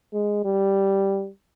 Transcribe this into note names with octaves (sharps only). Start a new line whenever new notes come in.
G#3
G3